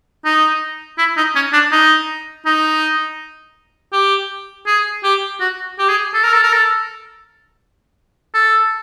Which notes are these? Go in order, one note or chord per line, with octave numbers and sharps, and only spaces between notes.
D#4
E4
D#4
C#4
D4
D#4
D#4
G4
G#4
G4
F#4
G4
G#4
A4
A#4
A4
A#4
A4
A4